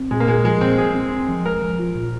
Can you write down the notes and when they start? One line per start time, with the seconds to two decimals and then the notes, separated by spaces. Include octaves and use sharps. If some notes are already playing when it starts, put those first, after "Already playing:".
Already playing: C4
0.11 A#2 G#3
0.20 A#3
0.27 A#2 G#3
0.45 F3 G#3
0.61 A#2 C4
0.78 F3 G#4
0.95 C4
1.12 C4
1.28 F3
1.45 G#3 A#4
1.62 F3
1.79 F4
1.96 A#2